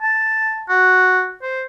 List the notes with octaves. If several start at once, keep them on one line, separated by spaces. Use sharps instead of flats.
A5
F#4
C5